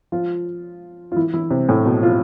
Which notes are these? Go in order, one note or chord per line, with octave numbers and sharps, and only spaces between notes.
F3 F4
F4
E3 E4
E3 E4
C3 C4
A2 A3
B2 B3
F3 F4